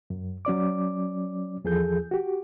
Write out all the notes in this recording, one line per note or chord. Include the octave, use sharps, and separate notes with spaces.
F#2
F#3 C#4 D5 D6
E2 F3 G#4 A4 G6
F#4 G4